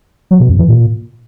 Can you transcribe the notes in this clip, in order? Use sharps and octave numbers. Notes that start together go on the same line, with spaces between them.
F#3
B2
F2
E3
A#2